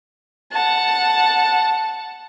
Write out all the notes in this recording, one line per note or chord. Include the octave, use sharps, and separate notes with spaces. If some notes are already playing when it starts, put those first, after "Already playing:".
F#5 A5